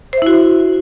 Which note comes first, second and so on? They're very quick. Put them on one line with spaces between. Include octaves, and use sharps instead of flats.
C5 E5 E4 F#4